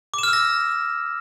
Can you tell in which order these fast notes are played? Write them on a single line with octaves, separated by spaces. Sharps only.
D6 E7 F6 E6 A#6